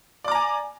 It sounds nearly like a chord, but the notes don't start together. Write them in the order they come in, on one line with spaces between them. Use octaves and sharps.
D5 D6 A#5 G#5